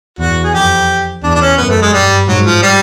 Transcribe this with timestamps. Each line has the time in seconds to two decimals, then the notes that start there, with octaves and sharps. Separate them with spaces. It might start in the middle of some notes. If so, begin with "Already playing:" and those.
0.19 E2 F#4
0.44 G#4
0.53 F2 G4
1.23 E2 D4
1.35 D4
1.41 C#4
1.58 F#2 B3
1.70 A3
1.82 G#3
1.93 G2 G3
2.28 G#2 F#3
2.45 F3
2.62 G3